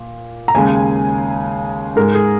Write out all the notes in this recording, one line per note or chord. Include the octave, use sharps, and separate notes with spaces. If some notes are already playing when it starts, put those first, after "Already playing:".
Already playing: A#2
A#5
D#2 C#3 G#3 G#5
G#2 G#3 A#4
G#4